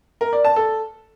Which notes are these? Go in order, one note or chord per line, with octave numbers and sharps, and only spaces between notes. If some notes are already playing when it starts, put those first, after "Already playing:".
A#4
D5
A5
A4